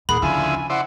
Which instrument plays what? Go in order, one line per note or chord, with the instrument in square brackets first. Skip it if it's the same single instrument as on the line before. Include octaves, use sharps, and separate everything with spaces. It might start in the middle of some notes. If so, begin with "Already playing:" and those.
[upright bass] D#2 [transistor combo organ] A#2 F#5 [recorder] G#4 [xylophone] B5
[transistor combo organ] D2 F3 E4 [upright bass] C#3 [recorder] G#5
[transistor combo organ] E4 C5 D5 [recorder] F#5